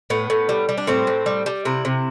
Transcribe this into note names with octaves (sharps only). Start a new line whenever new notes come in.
A2 B3
A2
G3
G3
D4
A2 C4
A2
G3
G3
C3 E4
C3